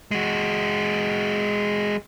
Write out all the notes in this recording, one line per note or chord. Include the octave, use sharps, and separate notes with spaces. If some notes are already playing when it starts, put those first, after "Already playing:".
G#3 F#4